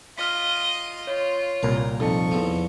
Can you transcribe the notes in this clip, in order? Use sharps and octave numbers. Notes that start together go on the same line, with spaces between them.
F4 D#5 F6 B6
F4 C#5
C2 A#2 A#4
F2 D#4 A4 A5 C#6
E2 F3